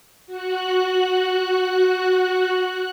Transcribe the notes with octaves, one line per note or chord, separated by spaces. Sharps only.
F#4 F#6